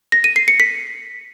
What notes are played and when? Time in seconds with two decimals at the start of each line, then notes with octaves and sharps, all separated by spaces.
0.12 A#6
0.24 D#7
0.36 C7
0.48 C#7
0.60 B6